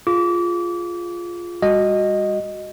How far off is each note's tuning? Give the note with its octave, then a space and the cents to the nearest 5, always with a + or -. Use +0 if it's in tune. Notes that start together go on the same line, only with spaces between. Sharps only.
F4 +0 G#4 +5 D6 -30
G3 +35 F#4 +0 D#5 -5